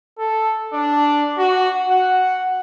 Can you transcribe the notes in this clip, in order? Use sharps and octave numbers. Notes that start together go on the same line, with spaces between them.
A4
D4
F#4
F#5